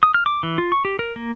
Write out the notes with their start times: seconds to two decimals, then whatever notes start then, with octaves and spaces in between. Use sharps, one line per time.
0.03 D#6
0.14 F6
0.26 D6
0.43 E3
0.58 F4
0.72 C#6
0.85 G4
0.99 A#4
1.16 A#3